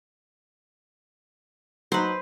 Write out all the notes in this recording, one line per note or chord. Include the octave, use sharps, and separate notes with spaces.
F#3 D#4 B4 C5